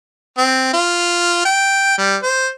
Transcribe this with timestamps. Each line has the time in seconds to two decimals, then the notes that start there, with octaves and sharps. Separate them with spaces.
0.38 C4
0.73 F4
1.45 G5
1.98 G3
2.23 C5